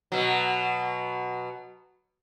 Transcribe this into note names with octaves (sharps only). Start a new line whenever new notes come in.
B2 F#3